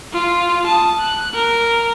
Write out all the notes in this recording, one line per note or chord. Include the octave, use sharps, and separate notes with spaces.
F4
A5 D#6
F#6
A#4